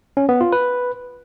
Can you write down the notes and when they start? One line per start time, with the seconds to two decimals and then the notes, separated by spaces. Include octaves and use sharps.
0.17 C#4
0.29 B3
0.41 F4
0.52 B4